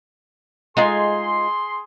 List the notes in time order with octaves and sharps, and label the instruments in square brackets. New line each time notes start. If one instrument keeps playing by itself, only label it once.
[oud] G#3 [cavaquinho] D#4 F4 G#5 [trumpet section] G#4 C6